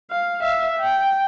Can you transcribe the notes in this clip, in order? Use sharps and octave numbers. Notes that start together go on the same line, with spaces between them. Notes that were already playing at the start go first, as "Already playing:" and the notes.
F5
E5 F5
G5